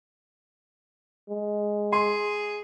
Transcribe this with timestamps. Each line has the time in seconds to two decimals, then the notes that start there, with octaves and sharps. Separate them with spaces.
1.29 G#3
1.93 G#4 C6